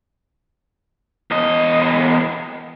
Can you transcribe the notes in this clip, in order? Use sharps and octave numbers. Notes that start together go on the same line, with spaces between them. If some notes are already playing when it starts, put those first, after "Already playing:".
E2 D#5